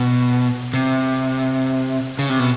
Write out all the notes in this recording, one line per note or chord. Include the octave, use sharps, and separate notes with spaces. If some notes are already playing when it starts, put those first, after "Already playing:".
Already playing: B2
C3
C#3
C3
B2